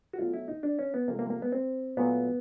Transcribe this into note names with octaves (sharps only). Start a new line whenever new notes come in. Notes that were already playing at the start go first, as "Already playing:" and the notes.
F#4
B2 F#3 A3 F4
E4
D#4
D4
C#4
B3
C3 F3 A3 A#3
A#3
A#3
B3
C4
A#2 F#3 A3 B3